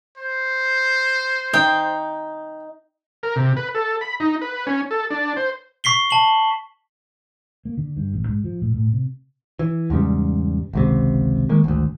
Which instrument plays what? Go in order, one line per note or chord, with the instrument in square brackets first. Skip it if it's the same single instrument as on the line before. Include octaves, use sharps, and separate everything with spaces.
[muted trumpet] C5
[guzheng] D#4 [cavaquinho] G5
[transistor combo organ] A#4
C3
B4
A4
B5
D#4
B4
C#4
A4
D4
C5
[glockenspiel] C#6 B6 C7 G7
A5 F#7
[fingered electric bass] A#3
D3
G2
A1
G#2
F3
A2
A2
C3
[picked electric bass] E3
E2 G#2 C#3 G3
G#1 C#2 C3
D#3 G#3 A#3
G#1 D2